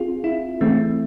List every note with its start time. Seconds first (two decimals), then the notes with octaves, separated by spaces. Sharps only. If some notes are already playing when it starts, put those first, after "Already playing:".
Already playing: C4 F4 G#4
0.24 E4
0.61 E3 A3 C4